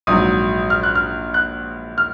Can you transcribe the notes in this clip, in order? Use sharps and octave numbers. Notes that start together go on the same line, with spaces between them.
A#1 G#2 F#3 D#6
F6
F#6
F6
F#6
F6